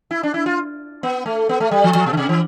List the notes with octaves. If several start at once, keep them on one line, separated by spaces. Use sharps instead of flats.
E4
D4
E4
F4
B3
A3
B3
A3
G3
F3
F3
B2
D3
C3
E3